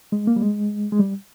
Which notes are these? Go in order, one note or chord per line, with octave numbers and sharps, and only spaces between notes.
G#3
A#3
G3
G#3
G#3
G3